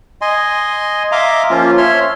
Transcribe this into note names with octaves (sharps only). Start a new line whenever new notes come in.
D#5 G#5 C6
E5 F5 A#5 C6 D6
F3 A#3 C#4 F4
C#5 E5 C6 F6